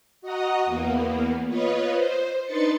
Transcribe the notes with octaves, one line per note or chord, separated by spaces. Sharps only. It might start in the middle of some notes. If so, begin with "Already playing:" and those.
F#4 D#5 F#5 A#5 D#6
E2 A#3 B3
F4 B4 C#5 D#5
C5
D4 D#4 B4 C6 A6 C#7